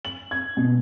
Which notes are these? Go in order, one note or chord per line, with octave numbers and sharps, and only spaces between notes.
F#7
G#6
B2